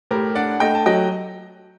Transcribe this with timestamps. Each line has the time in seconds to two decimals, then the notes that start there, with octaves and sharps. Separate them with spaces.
0.11 A2 G4 A#4
0.35 D4 D5 F#5
0.60 A3 D#5 G5
0.75 A5
0.86 F#3 D#5 G5